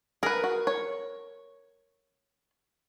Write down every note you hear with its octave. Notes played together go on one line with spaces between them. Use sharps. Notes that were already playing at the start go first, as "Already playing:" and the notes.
G#4 A#4 B4
F#4
C#5